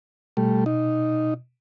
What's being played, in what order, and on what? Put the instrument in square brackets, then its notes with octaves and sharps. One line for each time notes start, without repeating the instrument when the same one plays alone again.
[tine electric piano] B2 [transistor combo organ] G3 A3
[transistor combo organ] D#4